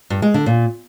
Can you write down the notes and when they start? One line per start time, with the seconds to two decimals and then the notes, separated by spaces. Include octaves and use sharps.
0.10 G2
0.22 G#3
0.34 D3
0.46 A#2